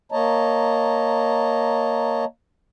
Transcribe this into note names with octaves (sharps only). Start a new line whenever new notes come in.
A#3 C#5 D#5 A5 A#5